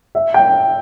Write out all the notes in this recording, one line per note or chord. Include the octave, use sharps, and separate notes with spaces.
E5
G5